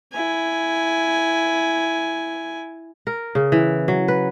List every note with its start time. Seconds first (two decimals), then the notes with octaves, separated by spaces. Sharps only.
0.13 E4 G#5
3.07 A#4
3.35 C#3
3.52 E3
3.88 F#3
4.08 B4